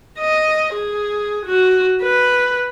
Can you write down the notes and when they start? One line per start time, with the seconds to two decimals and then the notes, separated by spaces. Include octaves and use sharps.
0.19 D#5
0.74 G#4
1.46 F#4
2.03 B4